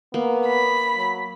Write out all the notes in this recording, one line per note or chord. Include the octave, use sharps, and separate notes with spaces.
A#3 B3
B5
F#3